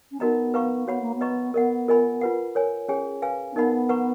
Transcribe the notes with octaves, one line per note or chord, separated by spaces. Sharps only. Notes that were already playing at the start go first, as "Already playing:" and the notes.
C#4
B3 D#4 F#4 A#4 D#5 A#5
B4 F5 A#5 C#6
B3 F#4 C#5 F#5 B5
A#3
B3
B4 D#5 A#5 C#6
B3 A#4 D#5 F#5
F4 A#4 D#5 G#5 B5
F4 B4 F#5
A#4 C#5 G#5
C#4 G#4 C#5 G#5
B4 F5 G#5
C#4
B3 D#4 A#4 D#5 F#5 B5
B4 F#5 A#5 C#6